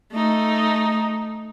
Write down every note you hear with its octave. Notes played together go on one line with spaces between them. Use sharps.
A3 D#4